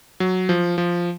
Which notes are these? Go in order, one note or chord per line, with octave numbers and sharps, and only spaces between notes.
F#3
F3
F3